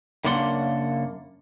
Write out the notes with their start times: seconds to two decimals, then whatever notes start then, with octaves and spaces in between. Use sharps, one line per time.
0.24 F#2 C#3 A#3 D4 F#5 C6